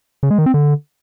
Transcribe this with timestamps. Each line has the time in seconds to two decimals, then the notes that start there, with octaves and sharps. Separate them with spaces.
0.23 C#3
0.31 G#3
0.38 D#3
0.46 C4
0.54 D3